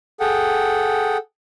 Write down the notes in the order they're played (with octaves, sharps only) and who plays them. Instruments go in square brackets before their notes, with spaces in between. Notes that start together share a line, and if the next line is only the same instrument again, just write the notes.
[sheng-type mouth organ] G#4 A4 F#5 G5